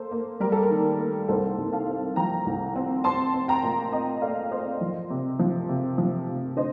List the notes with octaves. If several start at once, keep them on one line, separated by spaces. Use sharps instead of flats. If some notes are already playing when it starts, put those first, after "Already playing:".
Already playing: A#3 A4 C5
A#3
G3 A#4
A4
A#4
D#3
A#3
C2 A4 C5
C2
F5 A5
C4
F3 G5 A#5
C2
C4
C4 A5 C6
C4
G5 A#5
A#2
C4 D#5 G5
A3 D5 F5
C4 C5 D#5
F3
C3
F3
C3
F3
C3
D3 C5 D#5